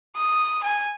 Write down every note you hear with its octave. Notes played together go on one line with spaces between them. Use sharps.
D#6
G#5